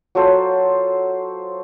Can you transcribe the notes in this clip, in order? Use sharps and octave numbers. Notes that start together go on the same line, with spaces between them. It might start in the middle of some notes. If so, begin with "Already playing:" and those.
F#3 F4 A4 C5